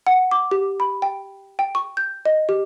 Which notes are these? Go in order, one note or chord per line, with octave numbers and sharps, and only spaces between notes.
F#5
D6
G4
B5
G5
G5
C#6
G6
D#5
G4